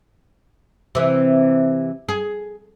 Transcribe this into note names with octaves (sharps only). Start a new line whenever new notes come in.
C3 E3
G#4